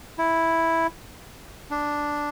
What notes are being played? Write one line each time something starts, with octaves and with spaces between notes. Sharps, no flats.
E4
D4